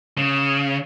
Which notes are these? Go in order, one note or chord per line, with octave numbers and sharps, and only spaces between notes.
C#3